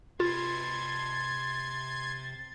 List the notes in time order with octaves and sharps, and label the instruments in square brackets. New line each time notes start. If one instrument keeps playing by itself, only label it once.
[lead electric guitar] C3 B4 [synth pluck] F4 [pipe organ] C6 G#6 [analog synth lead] A6